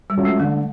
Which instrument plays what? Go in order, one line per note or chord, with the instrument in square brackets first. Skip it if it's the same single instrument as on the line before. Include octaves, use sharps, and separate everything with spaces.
[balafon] G3
[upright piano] F#3 A3 C#4 F4
[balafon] G#3
[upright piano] D3 [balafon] A3